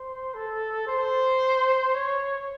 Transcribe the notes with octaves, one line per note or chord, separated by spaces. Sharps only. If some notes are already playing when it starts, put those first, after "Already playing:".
Already playing: C5
A4
C5
C#5